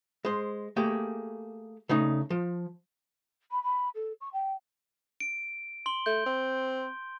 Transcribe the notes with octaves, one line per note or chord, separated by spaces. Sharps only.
G#3 C5
A3 A#3 G4 G#4
C#3 A3 D#4
F3
B5
B5
A4
C#6
G5
D7
C6 G7
A3 G6
C4